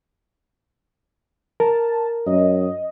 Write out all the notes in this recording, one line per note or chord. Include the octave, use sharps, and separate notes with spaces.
A#4 A5
F#2 D#5